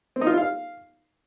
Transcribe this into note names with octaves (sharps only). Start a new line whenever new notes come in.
C4
D#4
F4
E4
F5